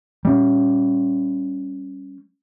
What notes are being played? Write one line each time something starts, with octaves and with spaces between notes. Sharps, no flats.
G3 C#4